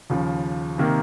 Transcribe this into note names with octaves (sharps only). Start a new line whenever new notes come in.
D#2 C#3 F3
C3 D#3 A#3